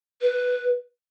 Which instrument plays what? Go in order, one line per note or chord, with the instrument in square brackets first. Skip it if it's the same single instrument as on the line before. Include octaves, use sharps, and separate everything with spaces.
[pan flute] B4